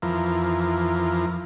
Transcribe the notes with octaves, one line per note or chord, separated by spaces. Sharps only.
F2 E3 F3 A#4